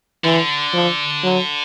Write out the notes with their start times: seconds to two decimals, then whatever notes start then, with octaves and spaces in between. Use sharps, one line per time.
0.24 D3 E3
0.73 F3
1.23 F#3